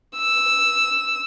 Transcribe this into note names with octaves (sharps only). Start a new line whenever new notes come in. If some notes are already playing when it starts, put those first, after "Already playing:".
E6